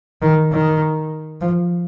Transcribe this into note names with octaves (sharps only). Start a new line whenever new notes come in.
D#3
D#3
F3